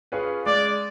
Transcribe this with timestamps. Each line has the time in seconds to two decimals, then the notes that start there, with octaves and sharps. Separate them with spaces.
0.12 C#4 F4 G#4 B4
0.46 G#3 D5